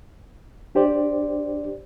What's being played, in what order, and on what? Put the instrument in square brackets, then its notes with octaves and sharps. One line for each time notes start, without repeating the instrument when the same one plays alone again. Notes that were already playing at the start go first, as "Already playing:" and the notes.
[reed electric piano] D4 G4 C5 D5